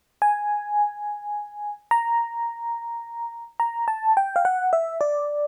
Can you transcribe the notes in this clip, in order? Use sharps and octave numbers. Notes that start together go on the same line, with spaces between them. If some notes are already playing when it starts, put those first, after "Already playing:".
G#5
A#5
A#5
A5
G5
F5
F#5
E5
D5